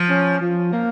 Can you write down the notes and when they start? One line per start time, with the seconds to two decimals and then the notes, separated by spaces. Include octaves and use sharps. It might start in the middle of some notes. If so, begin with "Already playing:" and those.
Already playing: F3
0.09 C#4
0.40 F3
0.72 A#3